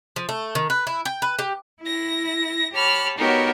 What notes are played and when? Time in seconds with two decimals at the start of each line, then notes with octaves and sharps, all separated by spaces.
0.16 F3
0.29 A3
0.55 D#3
0.70 B4
0.87 E4
1.05 G5
1.22 B4
1.39 G4
1.82 E4 A#6
2.72 G4 C#5 A5 B5 F6
3.17 B3 D#4 F#4 G4 A#4 C#5